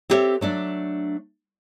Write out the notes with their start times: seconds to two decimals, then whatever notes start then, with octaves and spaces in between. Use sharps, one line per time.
0.10 C4 E4 G4 A4 C#5 E5
0.41 F#3 A3 D4 D5